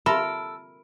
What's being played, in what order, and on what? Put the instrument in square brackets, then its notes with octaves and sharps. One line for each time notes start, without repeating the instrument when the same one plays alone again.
[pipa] A4 [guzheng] A#4 [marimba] E5 C6 [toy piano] B5